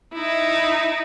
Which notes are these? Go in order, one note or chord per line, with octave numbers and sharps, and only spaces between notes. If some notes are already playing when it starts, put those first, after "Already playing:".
D#4 E4